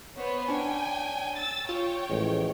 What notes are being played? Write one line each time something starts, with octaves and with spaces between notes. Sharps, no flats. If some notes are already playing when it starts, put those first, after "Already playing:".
B3 C5 C#5
C#4 D4 G5 G#5
E6 A6
F4 C#5 G5
A1 F3 G#3